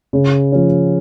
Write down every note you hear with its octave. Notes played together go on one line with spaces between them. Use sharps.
C#3
F3 C#4